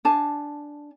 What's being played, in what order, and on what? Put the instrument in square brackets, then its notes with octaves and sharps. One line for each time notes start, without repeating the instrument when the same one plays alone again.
[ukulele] D4 G#5 A5